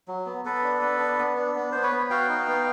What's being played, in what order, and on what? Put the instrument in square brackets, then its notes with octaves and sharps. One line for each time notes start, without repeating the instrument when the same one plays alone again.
[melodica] F#3
B3
B3 A4 B4
D4
B3
D4
B3
D4
B3
B3 C5
B4 C#5
B3
F#4 F5 G5
D#4
B3